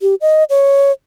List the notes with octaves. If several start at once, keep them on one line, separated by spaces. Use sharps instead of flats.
G4
D#5
C#5